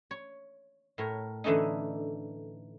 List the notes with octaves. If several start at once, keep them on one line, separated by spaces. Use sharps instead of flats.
C#5
A2 A#4 C#5
D3 E3 A3 C#4 D#4